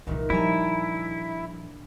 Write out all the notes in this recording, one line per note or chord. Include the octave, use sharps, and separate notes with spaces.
C2 A#2 D#3 E3 G#3
F3 G3 D4 E4 G#5 A#5